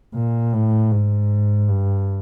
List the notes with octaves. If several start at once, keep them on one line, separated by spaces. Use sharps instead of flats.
A#2
A2
G#2
G2